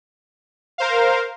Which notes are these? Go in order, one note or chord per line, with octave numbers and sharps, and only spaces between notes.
A#4 C5 F5